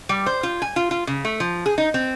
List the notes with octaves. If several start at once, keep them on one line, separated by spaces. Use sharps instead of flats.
G3
C5
F4
G#5
F4
F4
C#3
A3
F3
G#4
D#4
C4